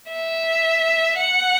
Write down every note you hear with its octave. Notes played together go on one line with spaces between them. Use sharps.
E5
F#5